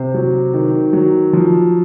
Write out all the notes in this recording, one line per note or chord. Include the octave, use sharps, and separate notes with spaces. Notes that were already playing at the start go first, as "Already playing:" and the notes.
Already playing: C3 C5
F#3
D#3
F#3
F3